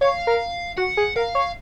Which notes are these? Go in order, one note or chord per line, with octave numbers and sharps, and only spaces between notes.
C#5 F5
A#4
F#4 F#5
G#4
A#4 F5
C#5